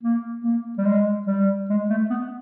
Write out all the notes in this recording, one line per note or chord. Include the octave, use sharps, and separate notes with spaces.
A#3
A#3
G3
G#3
G3
G#3
A3
B3